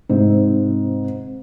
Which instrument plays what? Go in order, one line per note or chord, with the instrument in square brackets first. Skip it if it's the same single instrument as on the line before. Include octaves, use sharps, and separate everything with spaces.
[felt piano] G#2 [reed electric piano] C3 C4